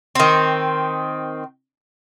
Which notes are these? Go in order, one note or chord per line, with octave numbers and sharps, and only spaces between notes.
D#3 C4